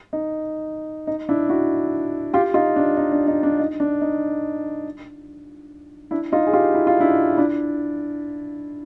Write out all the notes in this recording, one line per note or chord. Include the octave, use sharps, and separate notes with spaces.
D#4
D#4
D4 E4
E4 F#4
F4 G4
D#4 F4
D4
D#4
D4
D#4
D4
D#4
D4
D#4
D4 E4
D#4 F4
G#4
F4 G4
E4
F4
D4 E4
D4 E4